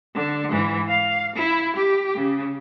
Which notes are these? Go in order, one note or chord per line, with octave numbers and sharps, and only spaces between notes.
D3
G#2 E3
F5
E4
G4
C#3